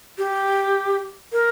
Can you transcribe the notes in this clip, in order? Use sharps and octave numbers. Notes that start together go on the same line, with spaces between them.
G4
A#4